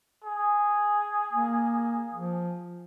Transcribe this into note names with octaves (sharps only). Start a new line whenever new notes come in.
G#4
A#3
F3